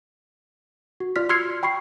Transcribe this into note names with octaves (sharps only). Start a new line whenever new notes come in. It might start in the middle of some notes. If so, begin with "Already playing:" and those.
F#4
F4 D5 F6 B6
C6 E6 F6 G#6 C7 C#7
G5 B5 C#6 C7